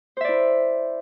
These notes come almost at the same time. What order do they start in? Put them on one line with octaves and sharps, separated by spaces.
C5 E5 D5 E4